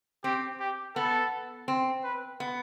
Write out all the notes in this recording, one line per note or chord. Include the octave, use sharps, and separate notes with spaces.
C4 G4
G4
B3 A4
C4
B4
B3